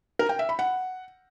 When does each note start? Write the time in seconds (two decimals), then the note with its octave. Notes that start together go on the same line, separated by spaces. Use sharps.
0.19 A#4
0.29 G5
0.39 E5
0.49 B5
0.59 F#5